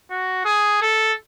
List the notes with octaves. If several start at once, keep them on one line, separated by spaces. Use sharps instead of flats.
F#4
G#4
A4